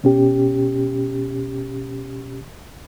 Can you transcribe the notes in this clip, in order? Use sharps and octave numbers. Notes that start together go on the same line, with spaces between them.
B2 C#4 G4